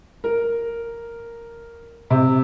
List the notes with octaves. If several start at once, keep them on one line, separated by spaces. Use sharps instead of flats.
A#4
C3